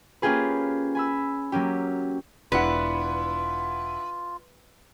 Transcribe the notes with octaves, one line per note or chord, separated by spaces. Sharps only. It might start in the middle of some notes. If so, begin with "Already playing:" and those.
A#3 C#4 F4 G4 G#4 B4
G#5 B5 E6
F#3 A#3 C#4 G4
E1 D4 E4 F4 B4 F#5